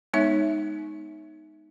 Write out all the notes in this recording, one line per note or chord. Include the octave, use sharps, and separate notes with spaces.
G#3 B3 D#4 C#5 E5